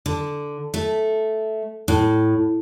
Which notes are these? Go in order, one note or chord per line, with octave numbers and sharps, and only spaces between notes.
D3
A3
A2